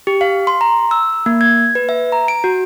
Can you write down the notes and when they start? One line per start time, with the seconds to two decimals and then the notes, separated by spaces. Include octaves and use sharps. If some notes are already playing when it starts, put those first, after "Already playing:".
0.07 G4
0.21 F5
0.47 C6
0.61 A#5
0.91 E6
1.26 A#3
1.41 G#6
1.75 B4
1.89 E5
2.12 A#5
2.28 D7
2.44 F#4